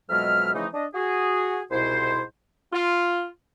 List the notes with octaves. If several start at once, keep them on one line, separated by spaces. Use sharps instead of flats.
F2 B2 F#3 G#3 E5 F6
C#3 E3 F3 A3 D#4
D4 D#5
F#4 G#4
C2 G#2 B2 E4 C5
F4